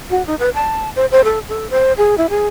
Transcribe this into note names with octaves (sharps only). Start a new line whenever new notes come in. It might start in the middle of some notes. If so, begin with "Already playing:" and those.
F#4
D#4
B4
A5
C5
C5
A4
A4
C5
G#4
E4
G#4